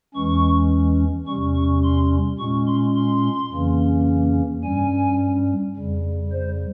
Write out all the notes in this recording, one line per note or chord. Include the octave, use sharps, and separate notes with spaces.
E2 E3 G#3 C#4 C#6
E2 C3 G3 C#4 C#6
C#6
C6
A#2 G#3 C#4 C#6
C6
C6
F2 C#3 E3 A#3 C#4
G2 G3 C#4 G#5
F2 C#3 G3
C5